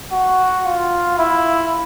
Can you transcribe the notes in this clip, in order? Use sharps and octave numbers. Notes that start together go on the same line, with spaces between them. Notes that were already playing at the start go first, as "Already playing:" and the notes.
F#4
F4
E4